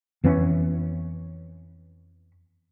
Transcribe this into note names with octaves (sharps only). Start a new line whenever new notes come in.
F2 E3 B3 C#4